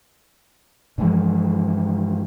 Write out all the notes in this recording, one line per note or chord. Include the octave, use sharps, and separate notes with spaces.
G2 E3 F3 G#3